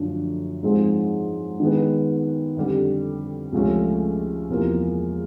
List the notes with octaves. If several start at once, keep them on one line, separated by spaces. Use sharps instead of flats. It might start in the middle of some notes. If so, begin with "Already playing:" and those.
Already playing: F#2 D3 F3 A3 D4
G#2 F3 G#3 C4 D#4
D#3 G#3 B3
F2 D3 G3
C#2 C3 F3 A3 C#4
E2 C3 F3 A#3